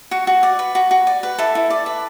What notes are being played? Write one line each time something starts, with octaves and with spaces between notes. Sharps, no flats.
F#4 F#5
F#4
D5
B4
F#4
F#4
D5
B4
E4 A4 A5
E4
D5
B4